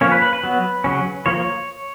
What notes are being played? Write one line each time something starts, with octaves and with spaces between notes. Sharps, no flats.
F3 A#3 C#4 C#5
B4
B4
B4
F#3 B3
C#3 F#3 C#4
F3 A#3 C#5